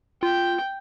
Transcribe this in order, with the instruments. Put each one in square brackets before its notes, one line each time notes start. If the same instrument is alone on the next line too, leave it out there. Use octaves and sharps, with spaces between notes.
[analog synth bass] F4 [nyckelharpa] G5